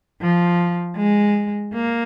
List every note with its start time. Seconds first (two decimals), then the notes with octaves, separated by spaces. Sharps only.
0.21 F3
0.97 G#3
1.74 A#3